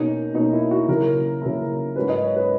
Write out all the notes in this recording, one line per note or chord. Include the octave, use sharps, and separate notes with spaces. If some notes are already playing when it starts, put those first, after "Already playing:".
Already playing: B2 A#3 C#4 D#4
B2 A#3 C#4 D#4
E4
F#4
C#3 F#3 A#3 E4 A#4
C#3 F#3 A#3 E4
G#2 F#3 C#4 E4 B4
D#5
C#5
B4